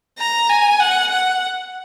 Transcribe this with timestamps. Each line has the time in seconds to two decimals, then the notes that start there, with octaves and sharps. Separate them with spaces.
0.19 A#5
0.49 G#5
0.80 F#5
1.12 F#5